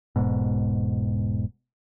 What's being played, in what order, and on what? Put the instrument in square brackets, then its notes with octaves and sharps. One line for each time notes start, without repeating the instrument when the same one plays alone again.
[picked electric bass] E1 G#2 B2